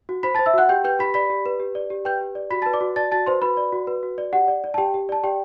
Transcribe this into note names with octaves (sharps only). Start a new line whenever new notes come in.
F#4
C5 B5 B6
A5 A6
C5
E5 E6
F#4 F#5 F#6
G4 G5 G6
B4 G5 G6
G4 B5 B6
D5 B5 B6
G4
B4
G4
D5
G4
B4 G5 G6
G4
D5
F#4 B5 B6
A5 A6
B4
D5 D6
F#4
D5 A5 A6
F#4 A5 A6
B4 C5 C6
F#4 B4 B5
D5
F#4
B4
F#4
D5
G4 F#5
D5
D5
A5
G4 G5
G4
D5 A5
G4 D5 G5